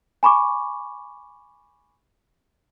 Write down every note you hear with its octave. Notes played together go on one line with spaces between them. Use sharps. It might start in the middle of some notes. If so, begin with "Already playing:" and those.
G#5 B5 C#6 D6